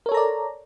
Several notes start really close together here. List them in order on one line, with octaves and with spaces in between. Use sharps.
A#4 C#5 A4 A#5 D5